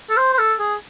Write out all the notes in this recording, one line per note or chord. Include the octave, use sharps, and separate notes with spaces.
A4
C5
C5
A4
G#4